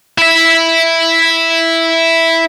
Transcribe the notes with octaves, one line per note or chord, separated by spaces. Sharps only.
E4 E5